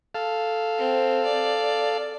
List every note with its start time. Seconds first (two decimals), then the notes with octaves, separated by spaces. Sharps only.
0.15 A4 F5
0.78 C4
1.25 D5